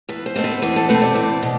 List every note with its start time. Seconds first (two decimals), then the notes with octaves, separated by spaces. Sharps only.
0.09 E2 B4
0.26 C5
0.36 B2 A3 C4
0.44 B4
0.62 E2 B4
0.76 A4
0.89 B2 A3 C4 B4
1.02 D5
1.15 E2
1.43 B2